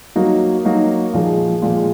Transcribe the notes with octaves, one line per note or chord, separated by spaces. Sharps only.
F#3 A#3 D#4 F#4
F#3 A#3 D#4 F#4
A#2 F3 G#3
A#2 F3 G#3